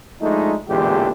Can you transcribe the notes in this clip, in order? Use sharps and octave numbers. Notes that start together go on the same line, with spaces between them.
F3 G#3 A3 D4 D#4
A1 E2 A#2 D3 G#3 G4